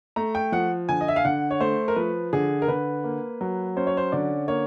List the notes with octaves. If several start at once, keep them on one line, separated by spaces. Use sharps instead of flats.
A3 A#5
G5
F3 F#5
D3 G#5
D#5
E5
F5
D3 F#5
C#5
A3 C5
A#4
F3 B4
D3 G#4
A#4
D3 B4
A#3
F#3
C#4 C5
C#5
C5
D3 D5
A#3 C#5